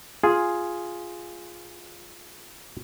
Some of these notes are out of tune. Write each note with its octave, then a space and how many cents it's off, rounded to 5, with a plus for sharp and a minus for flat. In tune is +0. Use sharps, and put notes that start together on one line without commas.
F4 +0 G#4 +0